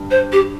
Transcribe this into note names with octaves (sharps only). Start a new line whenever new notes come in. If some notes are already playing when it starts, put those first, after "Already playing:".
Already playing: G2
C5
G4